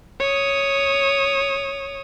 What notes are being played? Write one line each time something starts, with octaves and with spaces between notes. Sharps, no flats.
C#5 D#6